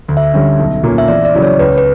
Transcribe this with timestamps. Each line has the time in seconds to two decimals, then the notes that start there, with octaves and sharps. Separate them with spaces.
0.08 D2
0.17 E5
0.34 D3 G3 C#4
0.59 B1
0.83 A#2 A#3 C#4
0.98 E5
1.08 E2 D5
1.25 D5
1.34 C#3 F#3 C#4 E4
1.42 C#5
1.59 C#2 B4
1.78 B4